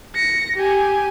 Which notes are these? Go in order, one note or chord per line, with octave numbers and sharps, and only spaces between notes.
A#6 C#7
G4 G#5